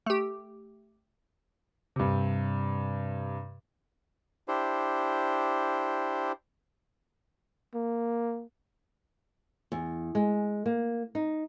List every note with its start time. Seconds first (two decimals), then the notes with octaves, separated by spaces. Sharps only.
0.06 A3 G4
1.96 G2 C3
4.48 D4 E4 G4 C5
7.74 A#3
9.72 E2
10.15 G#3
10.66 A#3
11.15 D#4